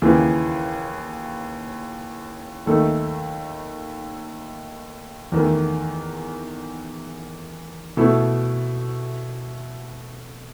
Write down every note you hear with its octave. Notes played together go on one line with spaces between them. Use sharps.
D#2 C#3 E3
D#2 D#3 A3 D#4 A4
E2 D#3 A3
B2 A3 E4 A4